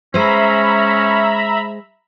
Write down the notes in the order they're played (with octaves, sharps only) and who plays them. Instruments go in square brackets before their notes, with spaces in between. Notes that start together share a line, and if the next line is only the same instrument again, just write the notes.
[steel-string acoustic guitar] G#3 C5 [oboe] C#4 [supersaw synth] E5 A#5 B5